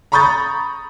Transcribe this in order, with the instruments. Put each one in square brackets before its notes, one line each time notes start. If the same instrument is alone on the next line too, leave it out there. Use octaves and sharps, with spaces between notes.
[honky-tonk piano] A#5 B5 C#6 D#6 G6 A6